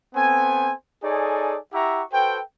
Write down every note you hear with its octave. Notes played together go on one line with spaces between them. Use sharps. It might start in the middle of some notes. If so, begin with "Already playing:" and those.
B3 C4 A4 C5 G#5
D#4 G#4 A4 C#5 D5 G#5
E4 G4 E5 F#5 A#5 C#6
F#4 A4 B4 C5 G5